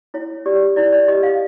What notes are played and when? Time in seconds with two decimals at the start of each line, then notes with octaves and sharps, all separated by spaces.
0.14 E4 C#5
0.46 G4 D5
0.76 E4 D5
0.93 D5
1.08 G4 D#5
1.23 F5